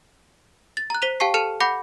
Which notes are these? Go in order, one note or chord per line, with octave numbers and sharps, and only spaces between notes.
A6
A#5 F#6
C5 B6 D#7 F7
G4 F5 G5 A5 C#6 C7
A4 A5 F6 C#7 D#7 F7
F#5 B5 D6 G6 A#6 C#7